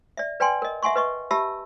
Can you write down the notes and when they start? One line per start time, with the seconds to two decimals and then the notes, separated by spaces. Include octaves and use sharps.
0.17 D5 E5
0.40 B4 D5 G5 G#5 C6
0.62 A#4 D#5
0.83 E5 F#5 G#5 C6 C#6
0.95 B4 D#5 C#6
1.31 G4 E5 A5 B5 E6